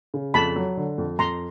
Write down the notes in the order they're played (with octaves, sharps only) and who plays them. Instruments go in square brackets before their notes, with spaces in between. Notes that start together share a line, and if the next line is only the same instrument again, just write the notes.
[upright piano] C#3
[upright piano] F2 [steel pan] A5 B5
[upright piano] F#3
D3
F2
[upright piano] F2 [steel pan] A#5 C6